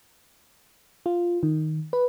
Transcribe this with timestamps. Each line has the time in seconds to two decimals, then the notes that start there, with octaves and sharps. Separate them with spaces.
1.06 F4
1.43 D#3
1.93 B4